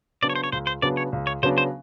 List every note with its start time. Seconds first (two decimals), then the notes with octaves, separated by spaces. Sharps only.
0.22 C#3 F#3 B3 D4 D5
0.30 C#5
0.35 C5
0.44 C#5
0.52 C#2 C5
0.67 C5
0.82 C#3 F#3 B3 D4 D5
0.97 C#5
1.13 C#2
1.27 C#5
1.43 C#3 F#3 B3 D4 C5
1.58 C5